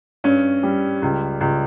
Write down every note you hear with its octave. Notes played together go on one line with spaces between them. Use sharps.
G2 C#4
G3
C#2
C#2